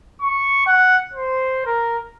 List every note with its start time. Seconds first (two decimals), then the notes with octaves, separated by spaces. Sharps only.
0.21 C#6
0.66 F#5
1.13 C5
1.66 A#4